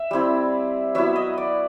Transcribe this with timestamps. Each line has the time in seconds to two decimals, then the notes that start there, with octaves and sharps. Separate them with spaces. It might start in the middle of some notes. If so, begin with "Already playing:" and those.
Already playing: E5
0.11 G3 C4 E4
0.95 F#3 B3 E4 E5
1.16 D#5
1.38 D5